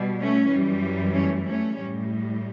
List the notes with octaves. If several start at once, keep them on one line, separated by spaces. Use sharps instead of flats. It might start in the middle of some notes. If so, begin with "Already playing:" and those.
Already playing: B2 G3
A3 C#4
F#2 E3 G3
A3 C#4
A3 C#4
A2 G3